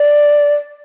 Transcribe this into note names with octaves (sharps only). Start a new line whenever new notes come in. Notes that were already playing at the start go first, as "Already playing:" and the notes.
Already playing: D5